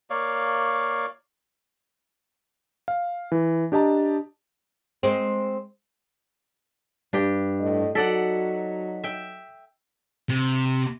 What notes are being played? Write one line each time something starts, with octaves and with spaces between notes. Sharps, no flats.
A#3 C#5 D5 F5
F5
E3
D4 G4 D#5 A5 A#5
G#3 C4
G2 D4 G4 G5
A2 D#5
F#3 D#4 A4 D5 F#5 B6
E5 G5
C3